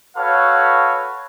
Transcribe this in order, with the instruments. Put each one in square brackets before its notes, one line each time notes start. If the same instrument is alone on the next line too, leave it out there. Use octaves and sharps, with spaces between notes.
[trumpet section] F#4 A4 B4 C#5 F5